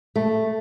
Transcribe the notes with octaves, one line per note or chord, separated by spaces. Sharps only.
A3